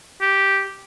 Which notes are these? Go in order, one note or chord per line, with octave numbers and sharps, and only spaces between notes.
G4